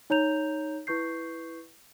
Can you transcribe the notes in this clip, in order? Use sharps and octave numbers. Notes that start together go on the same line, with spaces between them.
D#4 C#5 A#5 G6 F7
E4 B4 C#6 G6 C7